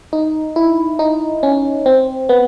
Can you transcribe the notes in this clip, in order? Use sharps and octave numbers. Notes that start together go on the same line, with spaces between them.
D#4
E4
D#4
C#4
C4
B3